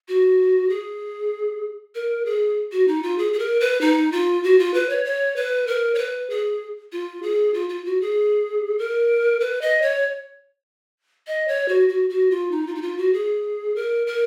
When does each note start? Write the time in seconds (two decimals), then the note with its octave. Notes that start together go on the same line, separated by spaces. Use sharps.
0.08 F#4
0.70 G#4
1.95 A#4
2.26 G#4
2.72 F#4
2.88 D#4
3.03 F4
3.18 G#4
3.33 G#4
3.39 A#4
3.60 B4
3.81 D#4
4.12 F4
4.44 F#4
4.59 F4
4.74 B4
4.90 C#5
5.05 C#5
5.36 B4
5.67 A#4
5.95 C#5
5.98 B4
6.30 G#4
6.92 F4
7.23 G#4
7.54 F4
7.69 F4
7.85 F#4
8.01 G#4
8.78 A#4
9.40 B4
9.61 D#5
9.82 C#5
11.27 D#5
11.48 C#5
11.68 F#4
11.89 F#4
12.10 F#4
12.31 F4
12.51 D#4
12.67 F4
12.75 D#4
12.82 F4
12.98 F#4
13.13 G#4
13.76 A#4
14.07 A#4